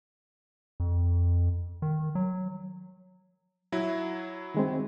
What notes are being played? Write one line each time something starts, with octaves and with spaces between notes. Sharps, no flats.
F2
D#3
F#3
F#3 E4
D#3 G#3 C4